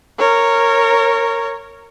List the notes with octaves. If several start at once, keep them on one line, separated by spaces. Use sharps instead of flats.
A#4 C#5